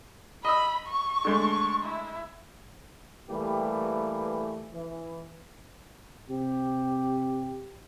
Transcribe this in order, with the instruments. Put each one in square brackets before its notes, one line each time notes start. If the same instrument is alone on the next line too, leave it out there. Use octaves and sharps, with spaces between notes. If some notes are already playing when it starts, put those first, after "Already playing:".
[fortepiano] D#5 E6 [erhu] B5
[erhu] C#6
[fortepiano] D3 G#3 A3
[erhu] E4
[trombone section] E3 G3 A3 A#3 G4 B4
E3
C3 G4